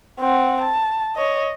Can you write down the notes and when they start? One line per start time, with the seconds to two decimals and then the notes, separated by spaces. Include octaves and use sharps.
0.20 C4 F#5
0.62 A5
1.16 C#5 D#5